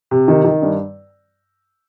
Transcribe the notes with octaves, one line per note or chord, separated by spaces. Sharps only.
C3
D#3
D#3
G2